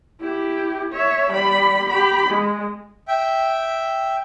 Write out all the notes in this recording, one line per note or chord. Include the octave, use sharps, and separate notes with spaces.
E4 G4
C#5 E5
G3 B5
G4 B5
G#3
E5 G5